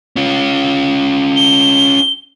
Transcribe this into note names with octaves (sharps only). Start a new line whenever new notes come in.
C#4 F4
G7